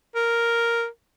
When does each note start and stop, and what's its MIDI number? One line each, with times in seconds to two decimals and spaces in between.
0.15 0.86 70